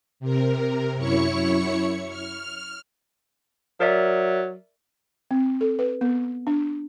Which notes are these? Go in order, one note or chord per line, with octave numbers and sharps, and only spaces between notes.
C3 A#4
F#2 E4 C#5 C#6 C#7
F6
F#3 A#4 D5 E5
C4
A4
B4
B3
D4